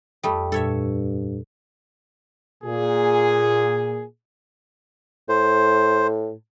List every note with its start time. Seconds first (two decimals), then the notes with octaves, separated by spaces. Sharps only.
0.23 F2 G3 A3 A5 D#6
0.52 G2 A#2 A4 C#5 E5
2.64 A#2 G#4
5.29 A2 C5